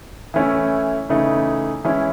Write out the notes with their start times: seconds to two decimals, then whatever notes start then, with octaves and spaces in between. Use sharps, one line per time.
0.34 E3 A3 C#4 E4
1.09 C#3 E3 A3 D#4
1.85 E3 G#3 C#4 E4